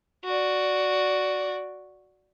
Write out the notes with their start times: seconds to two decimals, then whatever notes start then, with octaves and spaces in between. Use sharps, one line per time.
0.25 F#4 D5